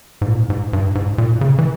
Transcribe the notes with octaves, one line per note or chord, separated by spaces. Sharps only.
G#2
A#2
G#2
G2
G#2
A#2
C#3
E3